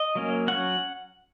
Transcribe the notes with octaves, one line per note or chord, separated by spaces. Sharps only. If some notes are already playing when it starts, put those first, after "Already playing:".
Already playing: D#5
F#3 A#3 C#4
F#3 C#4 F#5